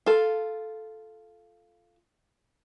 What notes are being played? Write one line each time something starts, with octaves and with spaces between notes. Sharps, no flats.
F4 A4